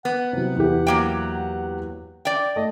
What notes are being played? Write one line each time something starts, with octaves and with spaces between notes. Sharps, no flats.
B3 F#5
C3 F#3
E2 G4
F#3 A#3 G5
D5 G5
A3 D#5